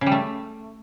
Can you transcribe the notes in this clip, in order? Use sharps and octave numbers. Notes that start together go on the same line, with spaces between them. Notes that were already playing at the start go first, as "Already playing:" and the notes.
C#3
G3
A3